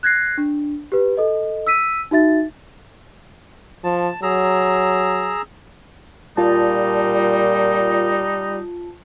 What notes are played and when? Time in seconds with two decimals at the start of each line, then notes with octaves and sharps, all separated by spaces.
0.03 F#6 G#6 A#6 C7
0.38 D4
0.92 G4 B4
1.17 A4 D#5
1.67 E6 B6 D#7
2.11 D#4 F#4 E5 A6
3.84 F3 A5
4.23 F#3 G#4 A#5 E6
6.37 A#2 G3 D#4 F4 A5